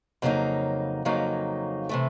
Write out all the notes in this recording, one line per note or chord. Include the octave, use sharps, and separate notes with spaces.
F2 C#3 F#3 A#3 D#4
F2 C#3 F#3 A#3 D#4
C3 E3 A3